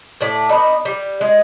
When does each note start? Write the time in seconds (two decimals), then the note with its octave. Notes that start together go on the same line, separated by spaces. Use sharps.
0.21 A2 A3 D5
0.49 B3 D4 D#4
0.85 G3
1.21 G#3